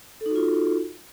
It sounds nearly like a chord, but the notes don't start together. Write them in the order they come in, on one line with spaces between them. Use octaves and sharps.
A4 D#4 F#4 F4